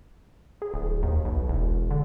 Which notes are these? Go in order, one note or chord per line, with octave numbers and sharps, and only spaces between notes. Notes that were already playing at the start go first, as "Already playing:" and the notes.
G#4
D1
D#2
B1
E1
D3